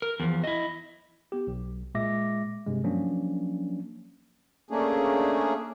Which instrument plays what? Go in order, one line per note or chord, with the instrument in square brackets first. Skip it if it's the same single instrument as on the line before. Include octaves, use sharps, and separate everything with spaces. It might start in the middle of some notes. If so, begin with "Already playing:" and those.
[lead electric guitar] A#4
E2 F3
E4 D#5
[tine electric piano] B3 G4
B1
A#2 G#3 E5 D6 A#6
G2 C3 G#3
F3 F#3 A#3 C#4 D4
[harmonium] A3 A#3 C#4 D4 G#4